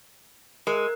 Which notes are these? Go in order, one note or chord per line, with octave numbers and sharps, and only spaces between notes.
G#3 A#4